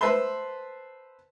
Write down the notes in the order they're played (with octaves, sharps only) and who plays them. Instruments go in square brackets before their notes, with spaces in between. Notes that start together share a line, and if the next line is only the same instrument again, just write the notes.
[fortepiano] B4 C5 E5 A5 C6